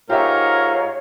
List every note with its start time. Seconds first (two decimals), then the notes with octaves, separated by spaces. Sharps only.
0.10 G#2 D#4 F4 G4 A#4 C#5 E5